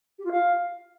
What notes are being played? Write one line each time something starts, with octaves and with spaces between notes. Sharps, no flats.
G4
F4
F5